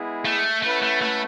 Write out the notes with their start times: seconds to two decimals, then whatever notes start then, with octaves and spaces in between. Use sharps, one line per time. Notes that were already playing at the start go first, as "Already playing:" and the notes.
Already playing: G#3 B3 E4 G#4
0.25 A3
0.63 A3 C#4 E4 B4 F#5
0.83 A3
1.02 A3